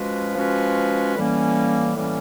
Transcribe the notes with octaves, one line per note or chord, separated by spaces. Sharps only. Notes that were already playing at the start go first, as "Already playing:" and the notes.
Already playing: F3 G#3 C#4 F#4 B4
F3 G#3 C#4 F#4 B4
A2 E3 G3 A#3 C#4
A2 E3 G3 A#3 C#4